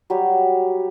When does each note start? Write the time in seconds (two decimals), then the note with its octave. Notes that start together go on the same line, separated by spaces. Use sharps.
0.10 F#3 G3 G4